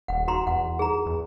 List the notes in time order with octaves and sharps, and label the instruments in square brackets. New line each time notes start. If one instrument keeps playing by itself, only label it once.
[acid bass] D#1 [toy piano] F#5
[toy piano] F#4 A#5 C6
[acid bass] E2 [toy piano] F#5
[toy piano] G#4 A#5
[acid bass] E2